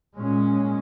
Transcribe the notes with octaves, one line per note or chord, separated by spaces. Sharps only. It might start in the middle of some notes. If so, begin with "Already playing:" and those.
A#2 G#3 C#4